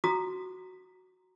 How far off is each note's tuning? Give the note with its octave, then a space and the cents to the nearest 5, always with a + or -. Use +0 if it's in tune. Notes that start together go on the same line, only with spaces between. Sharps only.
F#4 +0 A#5 +0 D#6 -30